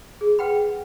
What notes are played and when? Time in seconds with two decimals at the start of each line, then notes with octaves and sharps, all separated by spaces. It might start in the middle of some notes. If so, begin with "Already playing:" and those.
0.21 G#4
0.39 B4 F#5 G5 B5